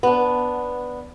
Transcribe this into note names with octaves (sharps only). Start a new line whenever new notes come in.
B3 D4